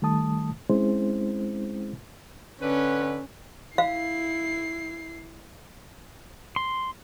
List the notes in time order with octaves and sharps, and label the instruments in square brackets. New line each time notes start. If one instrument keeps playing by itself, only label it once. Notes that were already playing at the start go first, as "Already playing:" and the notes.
[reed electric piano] D#3 G3 A3 A5 D#6
G#3 C4 C#4 E4 G#4 C5
[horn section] D3 B4 [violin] C#4
[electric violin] E4 C7 [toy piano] F5
[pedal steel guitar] C6